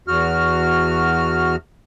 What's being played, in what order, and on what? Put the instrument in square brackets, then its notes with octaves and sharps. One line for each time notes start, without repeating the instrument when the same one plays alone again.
[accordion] E2 F#4 F6